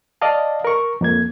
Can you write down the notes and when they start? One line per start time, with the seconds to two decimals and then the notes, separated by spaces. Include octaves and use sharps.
0.22 D5 D#5 F5 A5
0.65 A#4 C#6
1.01 F2 A#3 G#6